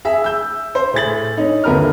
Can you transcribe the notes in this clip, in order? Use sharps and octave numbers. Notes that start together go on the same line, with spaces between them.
G#4 E5
E6 G6
C5
A2 G#4 A6 F#7
C#4 D#4
D#1 D3 A#4 B4 A#5 F6